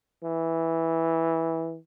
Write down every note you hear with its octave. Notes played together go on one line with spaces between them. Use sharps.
E3